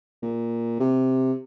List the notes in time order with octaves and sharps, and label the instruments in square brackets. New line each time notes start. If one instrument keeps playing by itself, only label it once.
[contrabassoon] A#2
C3